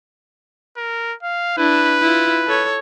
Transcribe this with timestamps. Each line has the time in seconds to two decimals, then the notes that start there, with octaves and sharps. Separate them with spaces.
0.77 A#4
1.22 F5
1.58 D4 E4 B4
2.02 E4 F4
2.47 A4 C#5